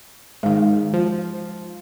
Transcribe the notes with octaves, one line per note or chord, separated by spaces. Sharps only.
G#2 D#3 G#3 F5
F3